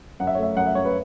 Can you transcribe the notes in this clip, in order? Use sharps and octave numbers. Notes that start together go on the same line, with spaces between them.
F#2 F#5
E5
C#5
A3 E5
F#2 F#5
E5
F#2 C#5
B4